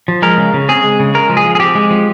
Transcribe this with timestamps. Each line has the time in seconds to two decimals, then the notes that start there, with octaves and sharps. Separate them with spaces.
0.08 F3
0.22 G#3 A#4
0.38 C#3
0.54 C#3
0.69 C4 G#4
0.83 G#3
0.99 C#3
1.14 G#3 A#4
1.30 F3
1.37 G#4
1.45 F3
1.55 G#4
1.60 C4 G4
1.75 G#3
1.91 F3